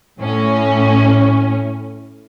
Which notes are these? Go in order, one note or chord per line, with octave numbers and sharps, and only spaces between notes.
A2 C#4